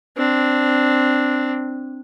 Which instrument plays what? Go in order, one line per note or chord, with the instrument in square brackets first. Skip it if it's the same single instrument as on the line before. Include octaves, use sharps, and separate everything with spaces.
[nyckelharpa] C4 D4